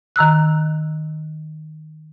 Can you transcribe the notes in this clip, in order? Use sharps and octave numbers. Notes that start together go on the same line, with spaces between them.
D#3 A#5 E6 F#6